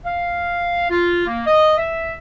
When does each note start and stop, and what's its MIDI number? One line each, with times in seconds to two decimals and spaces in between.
0.05 0.88 77
0.90 1.26 65
1.27 1.42 58
1.46 1.77 75
1.78 2.16 76